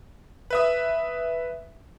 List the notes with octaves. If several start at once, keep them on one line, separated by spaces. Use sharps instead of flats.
B4 E5 D#6